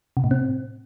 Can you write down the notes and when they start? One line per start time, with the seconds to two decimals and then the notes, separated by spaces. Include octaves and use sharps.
0.17 C3
0.24 A2
0.31 C4